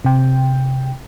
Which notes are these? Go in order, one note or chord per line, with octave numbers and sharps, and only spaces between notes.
C3 G5